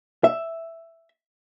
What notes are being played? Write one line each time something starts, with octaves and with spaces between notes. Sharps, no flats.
E5